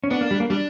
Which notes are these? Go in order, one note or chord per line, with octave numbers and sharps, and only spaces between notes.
C#4
B3 D4
A#3
G3
A#3
G3 D4